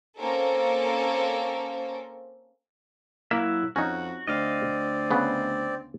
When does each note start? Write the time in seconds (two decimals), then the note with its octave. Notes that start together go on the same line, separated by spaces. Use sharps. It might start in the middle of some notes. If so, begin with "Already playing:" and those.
0.17 A#3 C4 C#4 A4 A#4
3.31 F#3 A#3 E4 E5
3.76 F2 C#4 D#4 F#4
4.28 D2 C4 D5 D#5 F5
5.11 C#3 B3